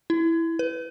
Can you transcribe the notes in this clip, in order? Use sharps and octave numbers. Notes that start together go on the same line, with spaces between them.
E4
B4